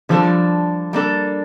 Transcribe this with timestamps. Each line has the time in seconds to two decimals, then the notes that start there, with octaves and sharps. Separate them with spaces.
0.09 D3 F3 G3 D4 A4
0.93 G3 A#3 D4 A4